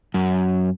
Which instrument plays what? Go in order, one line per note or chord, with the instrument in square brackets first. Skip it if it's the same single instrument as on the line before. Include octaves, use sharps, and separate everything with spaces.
[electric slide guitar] F#2